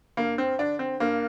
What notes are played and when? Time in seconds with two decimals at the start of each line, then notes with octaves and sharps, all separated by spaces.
0.17 G2 A#3
0.38 C4
0.59 D3 D4
0.79 C4
1.00 G2 A#3